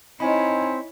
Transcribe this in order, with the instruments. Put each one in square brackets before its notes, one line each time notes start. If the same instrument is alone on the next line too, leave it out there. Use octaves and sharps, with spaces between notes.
[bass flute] C4 [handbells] D#4 G#5 B5 [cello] E4 C#5 [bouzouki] D#5